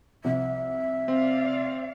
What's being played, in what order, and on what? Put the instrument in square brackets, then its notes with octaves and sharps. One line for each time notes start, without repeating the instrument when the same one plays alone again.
[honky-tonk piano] C2 C3 F3 [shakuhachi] E5
[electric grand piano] C4 [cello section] D5 F5